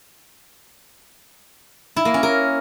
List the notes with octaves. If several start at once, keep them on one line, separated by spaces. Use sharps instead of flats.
E4
A#3
C#4
A#4